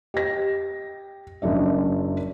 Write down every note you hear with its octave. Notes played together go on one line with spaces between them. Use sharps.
G4 D#5 A#6
F#1 F#2 D4 E5